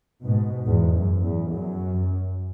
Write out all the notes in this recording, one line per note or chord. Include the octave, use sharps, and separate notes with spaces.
G#2 B2
E2 G#2
F#2
E2
F#2